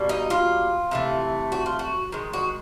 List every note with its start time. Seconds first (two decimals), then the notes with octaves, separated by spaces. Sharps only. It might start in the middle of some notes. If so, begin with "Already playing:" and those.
Already playing: B2 G3 A#3
0.09 D#4
0.30 F4
0.91 C3 E3 A3
1.52 F#4
1.66 F4
1.79 F#4
2.12 D#3 G#3
2.33 F#4